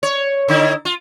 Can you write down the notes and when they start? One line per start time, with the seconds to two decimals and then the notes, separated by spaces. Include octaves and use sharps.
0.03 C#5
0.48 D3 D#4 E4
0.85 F4